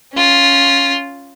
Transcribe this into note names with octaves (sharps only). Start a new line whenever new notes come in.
C#4 F4